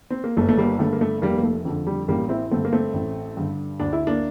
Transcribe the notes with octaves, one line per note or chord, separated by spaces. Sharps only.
C4
A#3
G1 A3
A3
G3 A#3
G2 D3 A3
A#3
A3
F1 G3 A#3
A#3
A3
F2 D3
G3
A1 G3 A#3
C4 E4
G2 D3 A3 C4
A#3
A3 C4
A1
G2 D3
D2 D4
E4
A#3 D4